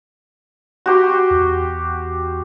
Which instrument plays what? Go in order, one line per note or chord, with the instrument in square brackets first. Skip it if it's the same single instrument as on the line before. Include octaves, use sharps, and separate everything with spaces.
[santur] F#4 G4 C6
[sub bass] E2